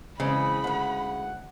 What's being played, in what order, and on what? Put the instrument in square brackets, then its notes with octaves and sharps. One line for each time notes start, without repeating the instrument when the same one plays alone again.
[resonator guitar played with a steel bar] C#3 [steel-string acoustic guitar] E3 G#3 C4 [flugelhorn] D#5 [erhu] B5
[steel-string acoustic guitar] D2 G#3 [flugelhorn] F#5